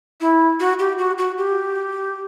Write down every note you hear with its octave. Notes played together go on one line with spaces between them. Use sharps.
E4
F#4
G4
F#4
F#4
G4